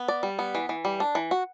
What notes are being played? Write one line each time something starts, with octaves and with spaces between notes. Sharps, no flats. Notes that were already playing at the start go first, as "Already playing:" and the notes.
Already playing: B3
D5
G3
B3
E3
E3
G3
D4
E3
F#4